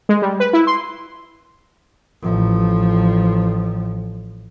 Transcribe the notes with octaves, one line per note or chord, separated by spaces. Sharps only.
G#3
G3
B4
E4
C6
A1 F3